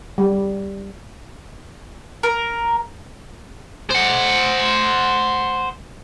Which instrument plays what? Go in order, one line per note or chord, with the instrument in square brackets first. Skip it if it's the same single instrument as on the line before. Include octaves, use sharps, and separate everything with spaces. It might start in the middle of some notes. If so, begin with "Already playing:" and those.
[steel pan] G3
[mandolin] A#4
[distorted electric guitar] C5 F#5